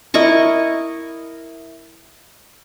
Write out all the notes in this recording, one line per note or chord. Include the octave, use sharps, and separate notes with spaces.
E4 A#4 D#5 C#6